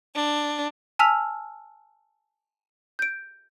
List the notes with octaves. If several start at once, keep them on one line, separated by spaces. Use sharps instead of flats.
D4
G#5 A5 E6 F6 B6 F7
G6 D7